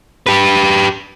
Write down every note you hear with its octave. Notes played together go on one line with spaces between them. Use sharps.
G4 B4